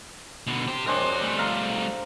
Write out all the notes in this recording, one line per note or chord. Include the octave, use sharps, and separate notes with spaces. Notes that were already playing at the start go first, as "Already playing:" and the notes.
B2 D3
G4 C5
G#3 C4 D4 A#4 C#5
G3 A3
A4 F5 A#5